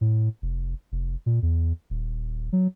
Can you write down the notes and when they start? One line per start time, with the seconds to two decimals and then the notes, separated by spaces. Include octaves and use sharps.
0.01 A2
0.42 F1
0.92 F1
1.26 A#2
1.42 E2
1.90 D#1
2.52 F#3